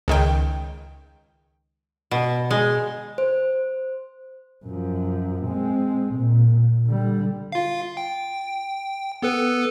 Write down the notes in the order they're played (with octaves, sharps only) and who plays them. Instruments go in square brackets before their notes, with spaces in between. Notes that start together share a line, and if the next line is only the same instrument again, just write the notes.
[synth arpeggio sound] C#2 D#3 D#5 G5
[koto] B2
G#3
[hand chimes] C5
[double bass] F#2 F3
G#3 C4
A#2
D3 G3
[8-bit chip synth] F4 F5
G5
B3 A4 B4